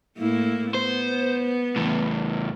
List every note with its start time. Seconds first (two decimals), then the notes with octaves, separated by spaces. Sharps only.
0.18 A2 A#3 E4
0.74 B3 C5
1.76 E2 A2